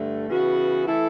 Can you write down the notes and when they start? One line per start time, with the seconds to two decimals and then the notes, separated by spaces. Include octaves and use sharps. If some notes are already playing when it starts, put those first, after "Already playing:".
Already playing: G2 D3 A3
0.28 C#3 E3 B3 F#4
0.87 E3 A3 E4 A4